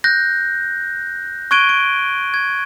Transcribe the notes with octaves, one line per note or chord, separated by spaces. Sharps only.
F#6 G6 A#6
C#6 F#6 G#6 D7 D#7 G7
D7
G#6